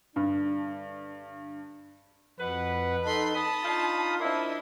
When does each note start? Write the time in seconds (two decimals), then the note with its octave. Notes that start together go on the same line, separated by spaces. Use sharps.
0.16 G2 D3 D4
2.40 F2 B2 B4 F#5
3.05 D#4 A4 B5 C6
3.34 A5 B5 D#6
3.64 D4 D#4 F4
4.20 F3 A#3 D4 E4 D#5